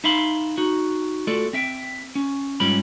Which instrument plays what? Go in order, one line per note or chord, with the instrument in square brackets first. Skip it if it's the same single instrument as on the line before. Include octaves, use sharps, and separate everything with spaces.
[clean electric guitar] D#4 E5 F5 B5 C6
D#4 F#4
A3 F4 F#4 A4 D5
C4 E5 G5
C#4
G#2 G3 C#4 F4 G4 B5